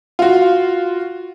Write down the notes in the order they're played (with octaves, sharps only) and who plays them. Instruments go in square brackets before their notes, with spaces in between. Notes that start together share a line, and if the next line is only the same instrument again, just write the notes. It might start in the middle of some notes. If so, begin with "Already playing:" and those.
[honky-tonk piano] F4 F#4